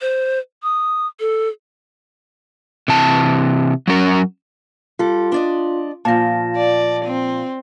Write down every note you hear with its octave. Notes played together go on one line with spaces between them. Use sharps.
C5
D#6
A4
C3 E3 A5
F#3 C#4 A#4
G3 F4 A4
D4 D5 D#5
A#2 F3 A5 A#6
D5
C4